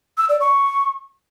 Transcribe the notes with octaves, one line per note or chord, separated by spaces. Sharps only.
E6
D5
C#6